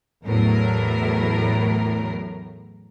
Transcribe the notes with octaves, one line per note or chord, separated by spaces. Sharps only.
E2 A2 F#3 A#4